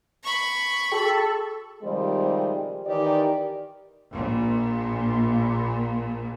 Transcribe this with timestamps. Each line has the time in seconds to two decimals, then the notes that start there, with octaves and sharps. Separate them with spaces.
0.23 B5 C#6
0.92 F#4 G#4 A4 G5
1.83 C3 D#3 F3 G3 G#3 C4
2.86 D#3 E3 G4 D5
4.12 A#1 A#2